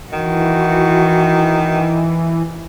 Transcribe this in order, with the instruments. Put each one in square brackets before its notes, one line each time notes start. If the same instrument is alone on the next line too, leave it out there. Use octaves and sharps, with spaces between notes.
[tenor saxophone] D#3 [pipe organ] E3 [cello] F#4